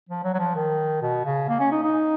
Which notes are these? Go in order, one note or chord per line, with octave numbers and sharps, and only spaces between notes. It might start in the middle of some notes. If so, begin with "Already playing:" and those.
F3
F#3
F#3
F3
D#3
B2
C#3
A#3
C#4
D#4
D#4